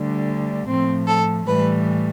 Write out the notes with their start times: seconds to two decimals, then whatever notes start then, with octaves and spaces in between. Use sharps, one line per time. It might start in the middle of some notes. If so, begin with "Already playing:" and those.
Already playing: D2 D3 G3
0.67 A2 F3 C4
1.07 A4
1.47 A2 E3 G3 B4